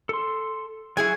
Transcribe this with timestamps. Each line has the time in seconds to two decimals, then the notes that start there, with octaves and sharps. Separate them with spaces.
0.09 A4 C6
0.97 F#3 E4 F#4 G#4 G#5